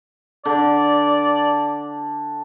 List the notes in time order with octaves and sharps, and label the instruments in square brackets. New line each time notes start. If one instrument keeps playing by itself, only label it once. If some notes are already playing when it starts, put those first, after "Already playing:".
[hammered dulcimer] D3 [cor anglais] D5